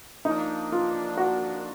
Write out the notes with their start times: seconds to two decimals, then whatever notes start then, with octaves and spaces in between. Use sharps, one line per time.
0.25 F3 A#3 D4 D#4
0.72 F4
1.17 F#4